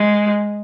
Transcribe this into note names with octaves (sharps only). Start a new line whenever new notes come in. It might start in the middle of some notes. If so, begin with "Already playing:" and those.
Already playing: G#3